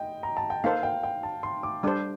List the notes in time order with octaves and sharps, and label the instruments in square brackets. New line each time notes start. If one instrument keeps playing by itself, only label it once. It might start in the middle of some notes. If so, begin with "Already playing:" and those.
Already playing: [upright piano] D#5 G5
A#5
A5
G5
[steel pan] A#3 D#4 A4 C5 [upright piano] F5
[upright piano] G5
G5
A5
C6
D6
[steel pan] G3 D4 A4 C5 [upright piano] D6